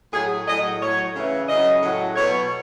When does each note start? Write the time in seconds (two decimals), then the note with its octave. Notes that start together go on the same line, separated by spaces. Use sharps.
0.12 A2 F#3 G#4
0.46 A2 F#3 D#5
0.80 A2 F#3 C#5
1.14 C#3 E3
1.49 C#3 F#3 D#5
1.82 A2 F#3
2.16 B2 F#3 C#5